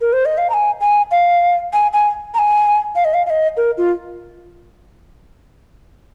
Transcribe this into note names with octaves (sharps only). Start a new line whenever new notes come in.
A#4
C5
D#5
F5
A#5
G#5
G#5
F5
G#5
G#5
A#5
G#5
F5
D#5
F5
F5
D#5
A#4
F4